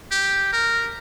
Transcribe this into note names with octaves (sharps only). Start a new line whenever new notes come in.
G4
A#4